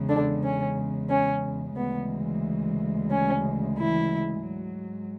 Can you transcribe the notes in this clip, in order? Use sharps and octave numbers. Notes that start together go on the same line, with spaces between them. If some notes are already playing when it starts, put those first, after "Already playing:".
Already playing: E2 C#3 G#3
D3 D4
C#4
C#4
D2 C#3 E3 G#3 B3
C#4
E3 E4
G#2 F#3